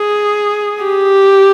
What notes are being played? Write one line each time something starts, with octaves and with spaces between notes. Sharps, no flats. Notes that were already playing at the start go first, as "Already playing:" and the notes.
Already playing: G#4
G4